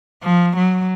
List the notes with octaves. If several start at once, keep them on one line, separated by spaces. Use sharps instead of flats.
F3
F#3